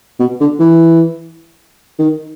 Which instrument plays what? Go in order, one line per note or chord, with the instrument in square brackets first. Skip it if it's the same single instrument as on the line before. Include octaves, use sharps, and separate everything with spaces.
[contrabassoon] B2
D3
E3
D#3